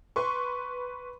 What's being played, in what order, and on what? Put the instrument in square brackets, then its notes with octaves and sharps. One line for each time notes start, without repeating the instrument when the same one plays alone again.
[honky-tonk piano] B4 C6 C#6